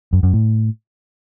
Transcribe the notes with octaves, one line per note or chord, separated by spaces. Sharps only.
F#2
F#2
A2